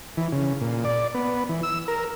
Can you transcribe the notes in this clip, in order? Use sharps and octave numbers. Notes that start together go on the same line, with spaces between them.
E3
C#3
A#2
D5
B3
E3
E6
A#4